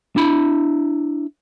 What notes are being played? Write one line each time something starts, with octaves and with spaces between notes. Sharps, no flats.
D4 E4 B5